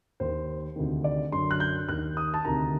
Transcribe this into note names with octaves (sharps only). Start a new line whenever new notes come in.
D#2 D#3 C5
D2 C3 D#3
D5
F#2 D3 C6
F#6
G6
D#2 D#3 F#6
D#6
A5
D2 C3 D#3 A#5